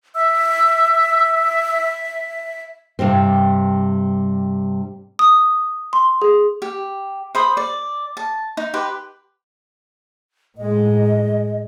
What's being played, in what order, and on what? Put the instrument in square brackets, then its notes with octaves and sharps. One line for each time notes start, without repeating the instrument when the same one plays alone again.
[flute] E5 [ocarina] E6
[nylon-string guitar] G2 C3 G3 C4
[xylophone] D#6
C6
G#4
[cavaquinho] G4
C5 B5 D#6
D5
A5
D#4
G4 B4 C6
[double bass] A2 G#3 [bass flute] D#5